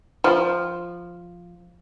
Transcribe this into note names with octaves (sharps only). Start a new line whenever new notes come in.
F3